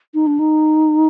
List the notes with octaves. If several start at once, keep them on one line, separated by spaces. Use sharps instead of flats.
D#4
D4
D#4